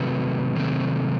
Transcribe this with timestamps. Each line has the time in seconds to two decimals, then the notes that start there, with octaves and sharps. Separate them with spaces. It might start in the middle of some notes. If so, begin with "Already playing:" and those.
Already playing: C3 D#3 F#3 A3 C4 B4
0.55 C3 D#3 F#3 A3 C4